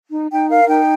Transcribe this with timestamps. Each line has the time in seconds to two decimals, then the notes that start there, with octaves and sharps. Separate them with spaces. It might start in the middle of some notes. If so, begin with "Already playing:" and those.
0.10 D#4
0.30 D#4 G5
0.49 A#4 F5
0.68 D#4 G5